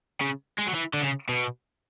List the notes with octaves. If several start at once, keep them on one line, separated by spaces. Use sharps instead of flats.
C#3
G#3
F#3
E3
D3
C#3
B2